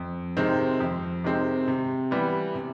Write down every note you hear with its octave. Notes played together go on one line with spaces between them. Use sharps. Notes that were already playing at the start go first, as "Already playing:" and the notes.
Already playing: F2
C3 D#3 G#3 C4
F2
C3 D#3 G#3 C4
C3
E3 G3 B3
C3